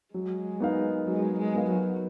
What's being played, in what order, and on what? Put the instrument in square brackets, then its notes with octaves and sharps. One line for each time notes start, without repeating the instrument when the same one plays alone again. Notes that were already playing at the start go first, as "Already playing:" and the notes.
[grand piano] F#3 [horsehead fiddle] G#3
[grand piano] B3 D#4 A#4 F5
[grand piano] F#3 [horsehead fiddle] G#3
[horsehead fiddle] G#3
[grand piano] B3 D#4 A#4 F5
[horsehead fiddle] F#3